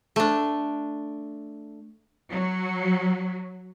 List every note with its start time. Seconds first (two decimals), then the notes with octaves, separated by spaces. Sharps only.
0.16 A3 D4
2.32 F#3